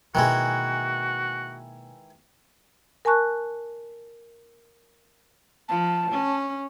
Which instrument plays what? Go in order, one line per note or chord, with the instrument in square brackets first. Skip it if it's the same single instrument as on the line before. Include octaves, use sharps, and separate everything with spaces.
[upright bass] B2 A#3 [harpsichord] D#3 E3 G#3 [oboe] F#4
[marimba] A#4 G#5 A5 C#6 F#6
[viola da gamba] F3 [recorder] A5
[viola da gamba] C#4